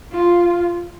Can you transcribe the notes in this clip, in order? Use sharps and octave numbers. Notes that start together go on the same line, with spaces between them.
F4